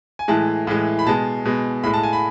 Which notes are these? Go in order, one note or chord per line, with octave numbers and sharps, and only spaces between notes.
G#5
A2 E3 G#3 A5
A2 E3 G#3
B5
B2 G#3 A5
B2 G#3
A2 G#3 B5
A5
G#5
B5